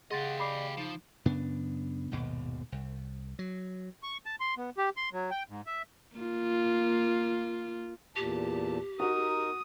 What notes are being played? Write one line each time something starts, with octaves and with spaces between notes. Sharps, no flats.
C#3 G4 G#4 D#5 F#5 C6 A6
D5 B5 D6 C7
F3 D#4
F#2 C#3 B3 D4
D#1 G#1 D#2 B2
C2
F#3
C#6
A5
C6
B3
G4
C6
F#3
G5
G#2
E5
A#3 F4
E2 A#2 G4 A5
D#4 F#4 A#4 D#6